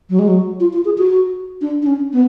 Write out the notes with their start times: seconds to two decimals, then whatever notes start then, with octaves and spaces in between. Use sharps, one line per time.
0.10 F#3
0.19 G#3
0.28 F#3
0.60 F4
0.73 F4
0.85 G#4
0.98 F#4
1.61 D4
1.82 D4
1.87 C#4
2.13 B3